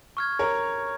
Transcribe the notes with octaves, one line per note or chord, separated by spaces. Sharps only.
C#6 F6 G#6
A#4 C#5